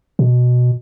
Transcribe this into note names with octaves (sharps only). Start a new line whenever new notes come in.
B2